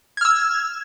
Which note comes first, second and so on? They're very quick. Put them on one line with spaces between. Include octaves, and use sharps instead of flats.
G#6 F6 E6